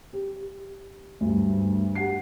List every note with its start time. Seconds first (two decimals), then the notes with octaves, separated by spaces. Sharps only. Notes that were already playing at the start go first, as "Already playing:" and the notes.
0.13 G4
1.20 D2 G2
1.95 G4 F#5 C7